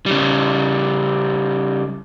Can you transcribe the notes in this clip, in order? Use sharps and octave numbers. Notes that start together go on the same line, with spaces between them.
C#3 G3